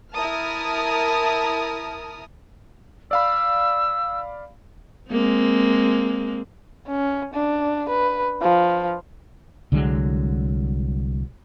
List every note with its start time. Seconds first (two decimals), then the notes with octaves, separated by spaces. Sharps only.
0.12 E4 A#4 A5 A#5 D#6 F6
3.11 D5 F5 B5 E6
5.10 G#3 A#3 C4
6.88 C#4
7.34 D4
7.89 B4
8.42 F3
9.72 C2 D3 F#3 G#3